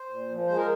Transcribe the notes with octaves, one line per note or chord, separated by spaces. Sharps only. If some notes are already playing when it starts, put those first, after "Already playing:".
Already playing: C5
A#2
F3
G#3 C5
A#4